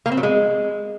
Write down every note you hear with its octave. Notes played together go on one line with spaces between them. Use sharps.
A#3
C4
F#3
G#3